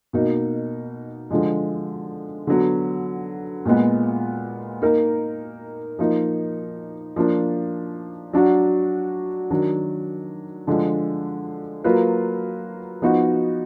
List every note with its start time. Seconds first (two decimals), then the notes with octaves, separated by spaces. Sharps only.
0.13 B2 A#3 D#4
1.30 D3 F3 G#3
2.47 D3 F#3 B3
3.65 A#2 G#3 B3
4.82 A#3 D#4 A#4
5.99 F3 A#3 D#4
7.16 F3 A#3 D4
8.33 F#3 D4 F#4
9.51 D#3 F#3 D4
10.67 D3 F3 G#3 D4
11.84 F#3 A#3 F4 B4
13.02 F3 B3 D#4 F#4